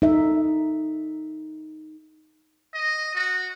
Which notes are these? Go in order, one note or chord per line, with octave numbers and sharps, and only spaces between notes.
D#4 A4 E5
D#5
F#4